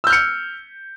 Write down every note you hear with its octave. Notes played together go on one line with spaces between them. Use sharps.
E6 F6 G6 C#7